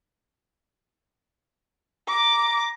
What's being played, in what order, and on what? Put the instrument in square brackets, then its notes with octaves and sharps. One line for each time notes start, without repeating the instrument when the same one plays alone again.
[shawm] A#5 [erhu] D6